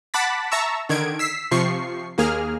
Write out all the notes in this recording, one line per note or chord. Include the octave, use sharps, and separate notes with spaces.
F#5 A5 B5 D6 A6 B6
E5 A5 A#5 C#6 E6
D3 D#3 G#6 D7
E6 B6 C7
C3 F3 C#6 C7
D#2 A#3 G#4 F6